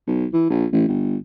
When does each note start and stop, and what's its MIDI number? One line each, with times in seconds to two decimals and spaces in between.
0.07 0.25 35
0.33 0.45 52
0.50 0.66 34
0.72 0.85 33
0.88 1.16 31